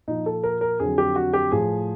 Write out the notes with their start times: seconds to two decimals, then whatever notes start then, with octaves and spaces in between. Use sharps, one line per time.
0.07 A#2 F3 D#4
0.26 A4
0.43 A#4
0.61 A#4
0.79 F2 D3 F#3 G#4
0.98 G4
1.16 F#4
1.33 G4
1.52 A2 F3 G#4